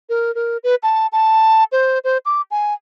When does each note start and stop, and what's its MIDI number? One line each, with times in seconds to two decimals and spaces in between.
0.09 0.34 70
0.35 0.57 70
0.64 0.75 71
0.83 1.07 81
1.12 1.64 81
1.72 1.99 72
2.04 2.18 72
2.26 2.41 86
2.51 2.74 80